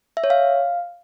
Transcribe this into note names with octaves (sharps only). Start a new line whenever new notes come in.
E5
C#5
F5